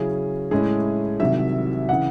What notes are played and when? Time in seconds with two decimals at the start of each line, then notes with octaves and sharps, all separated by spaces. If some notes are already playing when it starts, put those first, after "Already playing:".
Already playing: C#3 F#3 C#4 E4 G#4
0.51 A2 G#3 C#4 E4 G#4
1.20 C2 C3 D#3 F#3 E5
1.89 C#3 E3 F#5